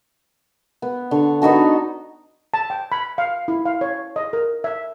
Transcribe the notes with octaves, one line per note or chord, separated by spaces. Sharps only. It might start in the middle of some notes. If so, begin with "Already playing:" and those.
B3
D3 C#6
B3 D#4 F#4 A4
A5
G5
B5
F5
E4
F5
C#5
D#5
A#4
E5